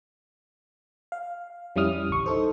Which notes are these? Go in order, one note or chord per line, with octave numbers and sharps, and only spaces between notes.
F5
F2 G3 C#4 E4 D#6 F6
A1 D2 C#6
D#4 A4 C5